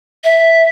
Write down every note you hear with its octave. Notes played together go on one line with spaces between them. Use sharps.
E5